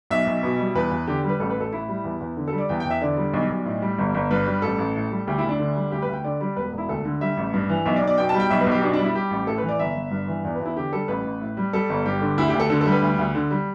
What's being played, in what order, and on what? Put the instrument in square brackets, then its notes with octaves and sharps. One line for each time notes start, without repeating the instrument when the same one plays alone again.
[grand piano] B1 E5
B1
B2
G3
E2 B4
E2
D3 G4
G3
B4
A1 A4
B4
A1 A4
A2 E4
G3
E2
E2
D3
A4
G3
D5
E2 G5
G5
E2
E5
D3 D5
G3
B1
B1
A2
G3
G1
G1
G2 B4
G3
A1 A4
A1
A2
G3
D2 G4
E4
D2
D4
D3
G3
D2 G4
B4
D2 G5
D3 D5
G3 D5
E1 B4
E1
E4
D2 A4
D3
G3 E5
A1
G2
E3
B1 E5
D5
B1
D5
B2 G5
A5
G3
G5
B1 E5
B4
B1
G4
B2 D4
D4
G3
E4
G3 G4
A1
A2 A4
B4
E3
D5
G1 E5
G1
G2
E3
E2 D5
E2 B4
E4
D3 G4
G3 A4
A1 B4
A1
A2
G3
G3 A4
G1
G2 G4
D3
D2 E4
G4
D2
A4
D3 A4
G3 A4
B4
D2
D2
D3
G3